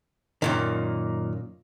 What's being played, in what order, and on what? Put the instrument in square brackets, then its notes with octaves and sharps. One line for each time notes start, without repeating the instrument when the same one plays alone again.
[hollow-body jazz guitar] F#2 A#2 D#3